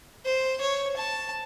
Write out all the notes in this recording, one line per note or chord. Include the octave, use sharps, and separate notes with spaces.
C5
C#5
A5